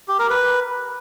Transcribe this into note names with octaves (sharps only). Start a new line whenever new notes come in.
G4
A#4
B4